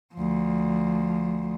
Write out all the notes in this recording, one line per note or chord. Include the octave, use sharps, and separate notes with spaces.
D2 F3